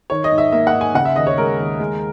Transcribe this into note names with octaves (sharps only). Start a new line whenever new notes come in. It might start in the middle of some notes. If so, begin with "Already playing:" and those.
D#3 C#5
D#5
G#2
E5
A#3 E5
F#5
G#2
G#5
C#3 F#5
E5
D#2 D#5
C#5
G#3 A#4
D#2
G#3